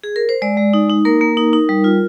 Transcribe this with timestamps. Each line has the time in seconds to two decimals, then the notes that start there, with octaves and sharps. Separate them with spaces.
0.04 G#4
0.16 A#4
0.29 C5
0.42 G#3 D5
0.57 G#3
0.73 D#4
0.90 D#4
1.05 A#3 A#4
1.21 A#3
1.37 D#4
1.53 D#4
1.69 G3
1.84 F4